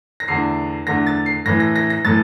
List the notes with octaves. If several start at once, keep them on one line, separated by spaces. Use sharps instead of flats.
A#6
E2 D3 A3 D4 C7
E2 D3 A3 D4 A#6
A6
C7
A2 E3 A3 A#6
A#6
A#6
A#6
A2 E3 A3 A6